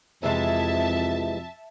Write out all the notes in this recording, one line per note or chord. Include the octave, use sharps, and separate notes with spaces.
F2 C3 E3 G#3 E5 A5